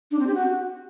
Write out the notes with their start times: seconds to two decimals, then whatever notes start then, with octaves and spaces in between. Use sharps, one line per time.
0.11 D4
0.19 C4
0.27 G4
0.35 F#4